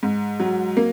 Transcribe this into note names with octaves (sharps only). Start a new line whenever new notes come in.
G#2
F#3
A#3